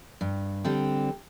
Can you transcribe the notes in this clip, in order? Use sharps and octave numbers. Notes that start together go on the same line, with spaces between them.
G2
D3 G3 C4